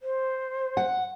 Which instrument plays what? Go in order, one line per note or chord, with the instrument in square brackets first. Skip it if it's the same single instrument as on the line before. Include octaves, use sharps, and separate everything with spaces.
[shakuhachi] C5
[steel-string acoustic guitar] F#5